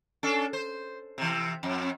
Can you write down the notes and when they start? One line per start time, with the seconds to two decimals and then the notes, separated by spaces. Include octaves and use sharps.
0.23 C#4 D4 A4
0.53 C5
1.18 C3 E3
1.63 F2